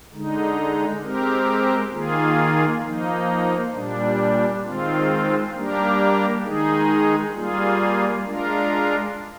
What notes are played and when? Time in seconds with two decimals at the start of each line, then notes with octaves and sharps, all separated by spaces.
0.13 D3 G#3 D#4
1.02 G#3 C4 G4 A#4
1.93 D#3 A#3 F4 G#4
2.83 F3 A#3 D#4
3.73 A#2 G3 D4
4.63 D#3 G#3 C4 F4
5.54 G3 A#3 D4 G4 A#4
6.43 D#3 G#3 D#4 G#4
7.34 G3 A#3 F4 G#4
8.24 G#3 D4 F4 A#4